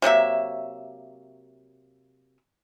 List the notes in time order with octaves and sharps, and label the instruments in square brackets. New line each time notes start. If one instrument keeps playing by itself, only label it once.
[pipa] C3 F#3 A#3 E5